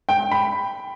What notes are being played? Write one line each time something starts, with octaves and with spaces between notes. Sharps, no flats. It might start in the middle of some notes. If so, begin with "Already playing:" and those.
G5
B5